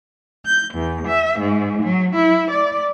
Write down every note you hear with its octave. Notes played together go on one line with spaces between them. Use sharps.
G6
E2
E5
G#2
F#3
E4
D5